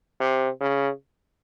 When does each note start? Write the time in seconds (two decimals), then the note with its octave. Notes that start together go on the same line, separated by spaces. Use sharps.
0.20 C3
0.61 C#3